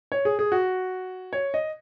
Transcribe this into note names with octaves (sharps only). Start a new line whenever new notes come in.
C#5
G#4
G#4
F#4
C#5
D#5